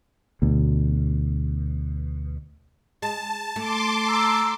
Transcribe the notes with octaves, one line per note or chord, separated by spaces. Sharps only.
D2 B2
G#3 A5
A3 C6 D6
A#5 E6